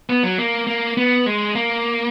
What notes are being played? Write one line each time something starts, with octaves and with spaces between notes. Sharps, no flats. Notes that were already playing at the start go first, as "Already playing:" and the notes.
B3
F#3
A#3
A#3
B3
G#3
A#3